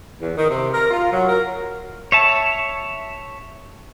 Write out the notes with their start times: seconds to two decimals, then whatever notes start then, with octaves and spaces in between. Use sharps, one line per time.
0.20 E2
0.35 D#3
0.49 C3
0.74 A#4
0.91 F4
1.11 F#3
1.29 A#4
2.12 C#5 E5 A5